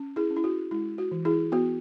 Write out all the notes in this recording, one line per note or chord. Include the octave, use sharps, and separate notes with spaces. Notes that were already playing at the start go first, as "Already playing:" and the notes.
Already playing: C#4
E4 G#4
C#4
E4
F#4
G#3 E4
F#4
E3
E4 G#4
B3 F#4